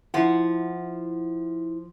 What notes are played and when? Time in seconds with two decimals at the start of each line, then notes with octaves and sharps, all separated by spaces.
0.14 F3 E4 F#5